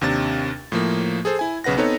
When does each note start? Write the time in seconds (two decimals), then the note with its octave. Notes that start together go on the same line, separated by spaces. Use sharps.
0.01 D#2 C3 D4 A6
0.72 A2 F3 A#3
1.25 G#4 A4 C5
1.39 E4 G#5
1.64 B1 C#3 B4 F#5 A#6
1.77 B3 C4 D#4 A4 B4 C#5